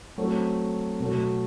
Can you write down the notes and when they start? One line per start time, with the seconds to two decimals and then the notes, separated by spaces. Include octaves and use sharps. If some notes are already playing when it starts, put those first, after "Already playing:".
0.18 F#3 A3 C4
1.00 B2 F#3 A3